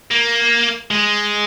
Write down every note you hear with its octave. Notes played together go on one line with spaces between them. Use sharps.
A#3
G#3